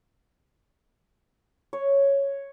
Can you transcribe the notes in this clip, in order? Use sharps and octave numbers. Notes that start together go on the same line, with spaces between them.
C#5